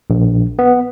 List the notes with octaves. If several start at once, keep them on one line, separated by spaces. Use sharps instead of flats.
A#1
B3